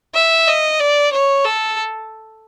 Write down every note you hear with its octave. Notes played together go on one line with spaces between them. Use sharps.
E5
D#5
D5
C#5
A4